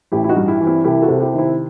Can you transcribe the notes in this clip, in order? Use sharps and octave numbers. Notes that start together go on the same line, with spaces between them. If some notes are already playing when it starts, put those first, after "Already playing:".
A1 E4 G4
E4
D#4 F#4
G2
E4 G4
E3
C4 E4
C2 E4 G4
F#4 A4
C3
E4 G4
D#3 C4 E4